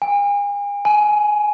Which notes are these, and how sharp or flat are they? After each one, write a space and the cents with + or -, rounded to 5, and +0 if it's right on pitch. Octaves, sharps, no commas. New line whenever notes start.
G#5 -40
G#5 +15